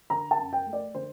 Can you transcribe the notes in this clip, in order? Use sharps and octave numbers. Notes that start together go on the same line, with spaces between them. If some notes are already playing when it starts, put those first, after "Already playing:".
D3 A#5
A5
F#2
G5
A3
D5
D3 C5